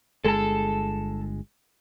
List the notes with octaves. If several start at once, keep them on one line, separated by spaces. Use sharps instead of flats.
G1 G#3 A4 A5